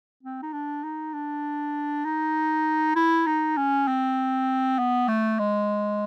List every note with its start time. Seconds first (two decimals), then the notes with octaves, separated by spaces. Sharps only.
0.23 C4
0.43 D#4
0.53 D4
0.84 D#4
1.14 D4
2.05 D#4
2.96 E4
3.27 D#4
3.57 C#4
3.88 C4
4.79 B3
5.08 A3
5.39 G#3